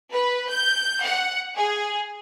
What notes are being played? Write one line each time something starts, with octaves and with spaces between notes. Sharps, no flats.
B4
G6
F#5
G#4